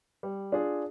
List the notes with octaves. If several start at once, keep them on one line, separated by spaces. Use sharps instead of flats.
G3
D4 F4 G#4